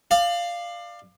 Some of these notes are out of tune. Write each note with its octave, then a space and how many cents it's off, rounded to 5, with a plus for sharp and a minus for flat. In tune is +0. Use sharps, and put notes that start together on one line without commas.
D5 +25 F5 -5